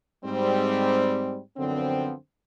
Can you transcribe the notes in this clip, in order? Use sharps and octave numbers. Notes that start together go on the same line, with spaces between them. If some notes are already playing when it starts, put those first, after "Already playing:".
G#2 G3 C4
F#2 D3 F3 B3 C4